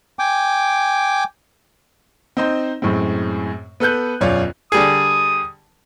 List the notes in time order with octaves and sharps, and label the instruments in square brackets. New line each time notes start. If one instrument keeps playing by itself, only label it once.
[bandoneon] G5 G#5 D6
[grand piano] C4 D#4 C5
F#2 A2 G#3 C4
B3 A4 B4 F#6 G6
E1 F#2 F4 C#5 D5
[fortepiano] D3 G3 G#4 [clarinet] D#6